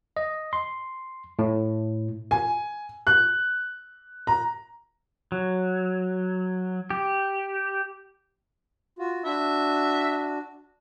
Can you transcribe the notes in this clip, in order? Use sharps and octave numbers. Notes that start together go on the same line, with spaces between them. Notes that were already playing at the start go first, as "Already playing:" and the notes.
D#5
C6
A2
G#5
F#6
A#5
F#3
G4
F4 F#4
D4 F#4 E5